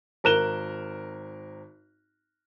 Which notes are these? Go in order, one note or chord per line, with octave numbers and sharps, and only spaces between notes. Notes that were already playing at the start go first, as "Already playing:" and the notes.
G#1 A#4 F#6 E7 G7